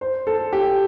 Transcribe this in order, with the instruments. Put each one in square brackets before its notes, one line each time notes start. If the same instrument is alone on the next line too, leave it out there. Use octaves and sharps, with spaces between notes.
[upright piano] C5
A4
G4